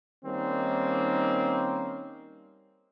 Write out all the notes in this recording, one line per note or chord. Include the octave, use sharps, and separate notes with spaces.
D#3 G3 A#3 C4 C#4 D#4